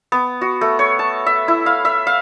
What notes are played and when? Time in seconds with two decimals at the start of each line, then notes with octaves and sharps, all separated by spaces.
0.12 B3
0.41 F#4
0.61 A3
0.79 C#5
0.99 A5
1.26 E5
1.48 E4
1.66 F5
1.85 E5
2.07 F5